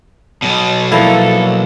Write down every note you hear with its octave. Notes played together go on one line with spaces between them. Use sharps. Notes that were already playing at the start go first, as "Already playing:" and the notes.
B1 B2
E3 F3 A#3 E4 A4